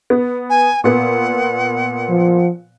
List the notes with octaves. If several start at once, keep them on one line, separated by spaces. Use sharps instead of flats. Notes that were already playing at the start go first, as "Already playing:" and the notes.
B3
G#5
A#2 B3 F#5
F3